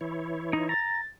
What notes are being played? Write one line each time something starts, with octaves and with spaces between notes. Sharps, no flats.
E3 E4 C#5
D#4
A#5 A6